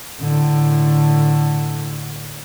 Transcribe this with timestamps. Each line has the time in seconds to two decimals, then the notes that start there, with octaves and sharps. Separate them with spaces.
0.19 A2 D3